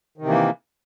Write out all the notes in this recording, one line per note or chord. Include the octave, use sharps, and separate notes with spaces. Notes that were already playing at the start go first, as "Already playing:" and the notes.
C3 D#3 E3 A#3